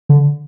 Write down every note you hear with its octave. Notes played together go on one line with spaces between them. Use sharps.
D3